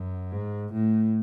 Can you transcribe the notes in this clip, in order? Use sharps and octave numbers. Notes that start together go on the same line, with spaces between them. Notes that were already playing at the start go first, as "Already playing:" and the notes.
Already playing: F#2
G#2
A2